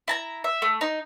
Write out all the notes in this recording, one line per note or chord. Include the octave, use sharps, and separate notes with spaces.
E4 A5 A#5
E5
A3
D#4